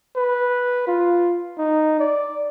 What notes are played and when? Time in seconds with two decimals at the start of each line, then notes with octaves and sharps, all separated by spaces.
0.16 B4
0.87 F4
1.58 D#4
1.99 D5